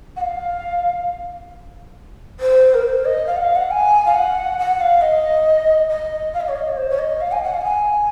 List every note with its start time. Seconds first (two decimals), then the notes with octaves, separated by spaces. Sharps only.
0.16 F#5
0.21 F5
2.40 C5
2.74 A#4
2.83 C5
3.05 D#5
3.26 F5
3.36 F#5
3.41 F5
3.55 F#5
3.71 G#5
4.05 F5
4.14 F#5
4.58 F#5
4.80 F5
5.01 D#5
5.89 D#5
6.33 F5
6.40 D#5
6.48 C#5
6.56 D#5
6.69 C#5
6.77 C5
6.90 C#5
6.99 D#5
7.20 F5
7.32 G#5
7.43 F#5
7.54 F5
7.60 F#5
7.64 G#5